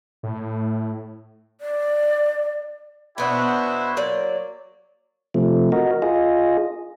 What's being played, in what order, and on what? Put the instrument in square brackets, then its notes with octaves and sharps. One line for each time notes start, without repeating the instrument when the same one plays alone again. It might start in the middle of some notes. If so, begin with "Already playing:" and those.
[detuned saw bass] A2
[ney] D5
[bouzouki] B2 B3 D4 [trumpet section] E4 F#4 C5
[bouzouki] F#3 A#3 D5
[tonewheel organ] C3 F3 A3
F#4 A#4 D#5
F4 G#4 D#5